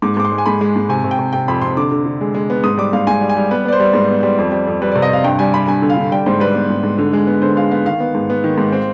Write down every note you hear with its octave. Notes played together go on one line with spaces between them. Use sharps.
G#2 D6
G#2 D6
C6
G#3
G#5
G#2 B5
G#3
G#2
C3 G#5
C3
G5
C3
C3 G5
F2 B5
C3 C6
D3 D6
D3
D3
G#3
G#3
B3
G#2 D#6
G3 D6
G#2 F5
G#2 G#5
G3
G#5
G3
B3 B4
B3 D5
C5
G3
G#2
B3
G3
F2
G3
F2
G3 B4
C3 D5
D#5
C3 F5
G2 G5
G3 G#5
G3 B5
G2 G#5
D3
F5
D3
G3 G5
G#2 C5
G3 B4
B3
G#2
G#2
D3
G#3
B3
D3 C5
G#3 F5
B3 F5
D#3 F5
B3
G#2
B3
D#3
G#2
C4